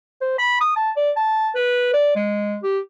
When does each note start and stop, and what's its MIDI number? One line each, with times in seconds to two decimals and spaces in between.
0.21 0.37 72
0.38 0.58 83
0.61 0.72 87
0.76 0.90 81
0.97 1.11 74
1.16 1.50 81
1.55 1.91 71
1.93 2.11 74
2.16 2.58 56
2.63 2.79 67